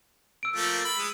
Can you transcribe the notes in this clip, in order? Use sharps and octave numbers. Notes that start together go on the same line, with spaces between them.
E6 D7
F3 A3 A#3
B5
G#3